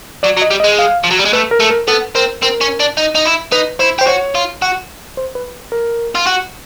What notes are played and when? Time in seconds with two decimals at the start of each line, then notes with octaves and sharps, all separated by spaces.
0.23 F#3 D5
0.37 F#3
0.42 D#5
0.50 G3
0.60 D#5
0.64 G#3
0.79 F5
1.04 F3
1.11 F#3
1.19 G3
1.26 G#3
1.33 A3 B4
1.51 A#4
1.60 A3
1.70 A#4
1.88 B3 A4
2.15 C4 A#4
2.42 C4 A#4
2.61 C#4
2.80 D4
2.97 D#4
3.15 D#4
3.26 E4
3.52 D#4 B4
3.79 E4 C5
3.99 G4 C5
4.07 F#4 C#5
4.35 F4
4.62 F#4
5.17 C5
5.35 B4
5.72 A#4
6.15 F4
6.27 F#4